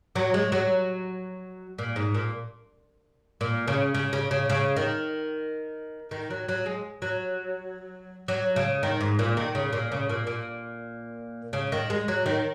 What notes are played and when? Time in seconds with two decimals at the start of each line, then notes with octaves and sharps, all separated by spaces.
0.15 F#3
0.34 G#3
0.52 F#3
1.78 A#2
1.96 G#2
2.14 A#2
3.41 A#2
3.67 C#3
3.94 C#3
4.13 C#3
4.31 C#3
4.50 C#3
4.76 D#3
6.11 D#3
6.30 F#3
6.49 F#3
6.66 G#3
7.02 F#3
8.28 F#3
8.56 C#3
8.83 D#3
9.01 G#2
9.19 A#2
9.37 D#3
9.55 C#3
9.73 A#2
9.92 C#3
10.09 A#2
10.27 A#2
11.53 C#3
11.72 D#3
11.90 G#3
12.08 F#3
12.26 D#3